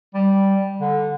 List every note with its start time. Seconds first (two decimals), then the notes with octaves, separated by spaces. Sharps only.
0.14 G3
0.81 D3